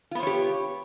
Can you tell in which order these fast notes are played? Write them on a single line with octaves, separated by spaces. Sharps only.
F4 B3 C5 C#5 G4